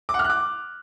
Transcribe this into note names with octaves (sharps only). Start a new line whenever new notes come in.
D6
F#5
F6
F#6
D6